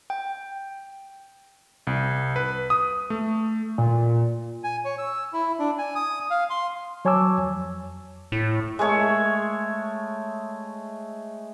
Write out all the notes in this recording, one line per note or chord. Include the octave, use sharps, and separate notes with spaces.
G5
C2
B4
D#6
A3
A#2
G#5
C#5
E6
E4
D4
G#5
D#6
F5
C6
F#3 C#5 G#5 A5 D6 E6
F2
A2
G#3 A3 C#5 E5